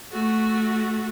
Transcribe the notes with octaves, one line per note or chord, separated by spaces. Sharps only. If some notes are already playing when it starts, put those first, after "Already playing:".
A3 F#4